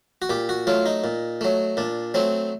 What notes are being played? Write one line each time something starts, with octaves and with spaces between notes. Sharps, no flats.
F#4
A#2 G4
F#4
F#3 A3 F4
D#4
A#2
F#3 A3
A#2 D4
F#3 A3 C4